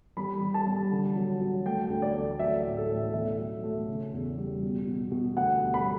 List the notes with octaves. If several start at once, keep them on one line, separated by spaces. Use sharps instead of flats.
G3 B5
G3
A5
G3
D3
F#3
F#3
A3 G5
D2
D5
A3
F#3 E5
A2
A4
A2
B2 E5
F#3
A3
C#3
E2
G3
B2
B2
B2
D2 F#5
G3
B5